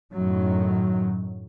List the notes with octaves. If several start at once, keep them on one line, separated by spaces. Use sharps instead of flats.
F#2 A2 D#3 F#3